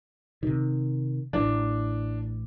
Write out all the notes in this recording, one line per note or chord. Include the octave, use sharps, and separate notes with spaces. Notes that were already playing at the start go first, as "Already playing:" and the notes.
C3 D#3
A1 E3 D4